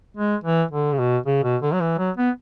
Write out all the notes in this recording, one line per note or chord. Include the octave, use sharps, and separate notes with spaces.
G#3
E3
D3
C#3
B2
C#3
B2
D3
F#3
E3
F#3
B3